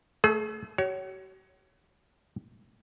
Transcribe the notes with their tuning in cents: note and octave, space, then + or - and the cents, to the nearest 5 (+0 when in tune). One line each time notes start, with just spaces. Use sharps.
A3 +0 G#4 +40
F#4 +45 C#5 +10